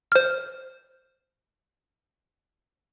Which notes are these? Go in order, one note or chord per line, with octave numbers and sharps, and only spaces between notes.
C5 F6